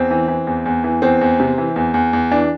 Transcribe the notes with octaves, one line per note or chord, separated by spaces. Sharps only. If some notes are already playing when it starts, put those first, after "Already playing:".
Already playing: E2 C4
E3
E3
E2
E2
E3
E2 C4
E2
C3
E3
E2
E2
E2
E3 D4